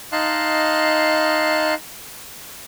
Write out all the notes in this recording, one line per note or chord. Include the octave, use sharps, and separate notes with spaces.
D#4 D#5 F5 A5 C6 F#6